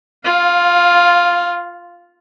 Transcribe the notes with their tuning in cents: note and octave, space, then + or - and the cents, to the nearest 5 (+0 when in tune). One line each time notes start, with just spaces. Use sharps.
F4 +0 F5 +25